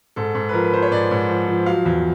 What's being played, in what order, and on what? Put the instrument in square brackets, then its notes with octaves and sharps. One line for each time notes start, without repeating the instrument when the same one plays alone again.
[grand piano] G#2 A4
G#2
B4
F3 A#4
B4
F3 C5
C#5
G#2 D5
G#2
F3
F3
F#3 F5
E2